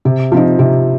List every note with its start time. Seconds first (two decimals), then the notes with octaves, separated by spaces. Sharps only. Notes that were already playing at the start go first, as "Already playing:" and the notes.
0.05 C3
0.32 F3 C4 D#4
0.59 C3